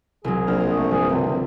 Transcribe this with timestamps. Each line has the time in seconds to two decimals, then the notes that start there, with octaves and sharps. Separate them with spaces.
0.24 C2 C#3 F#3 G#4
0.47 A#1 F6
0.61 C5
0.75 A3
0.91 G2 F3 G#4
1.09 D1 C#2 C3